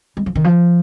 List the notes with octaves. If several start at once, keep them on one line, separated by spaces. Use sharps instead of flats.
G#3
F3
D#3
F3